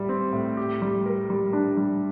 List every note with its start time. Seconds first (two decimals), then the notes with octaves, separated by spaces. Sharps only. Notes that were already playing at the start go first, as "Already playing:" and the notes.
Already playing: A2 G3
0.09 C4
0.33 A2
0.57 G4
0.82 G3
1.06 A#4
1.30 G3
1.53 D4
1.77 G3